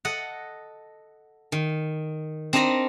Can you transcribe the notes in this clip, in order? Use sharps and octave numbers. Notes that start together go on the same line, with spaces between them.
A4 D#5 F#5
D#3
C4 D4 D#4 A#4 A#5 B5